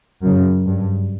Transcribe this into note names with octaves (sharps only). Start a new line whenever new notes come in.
F#2 C#3
G2